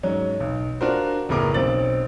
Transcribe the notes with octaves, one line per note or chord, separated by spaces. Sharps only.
G#2 F#3 C#4
B1
D4 F4 F#4 A#4 C5
F#1 A2 B3 A#4 D6
B1 C4 C#4 A6 F#7